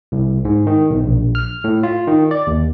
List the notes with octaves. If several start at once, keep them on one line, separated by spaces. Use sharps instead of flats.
C2
G#2
D#3
B1
A#1
F6
A2
F4
D#3
D5
D#2